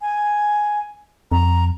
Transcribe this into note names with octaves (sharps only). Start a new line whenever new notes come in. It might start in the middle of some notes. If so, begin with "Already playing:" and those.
G#5
F2 A#5